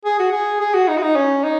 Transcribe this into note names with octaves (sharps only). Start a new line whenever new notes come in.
G#4
F#4
G#4
G#4
F#4
D#4
F#4
D#4
C#4
D#4